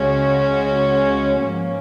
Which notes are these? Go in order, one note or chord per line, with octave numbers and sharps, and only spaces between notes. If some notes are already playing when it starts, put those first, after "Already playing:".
Already playing: C#2 C#3 G#3 C#4 F#4
G#2 F3 A#3 C#4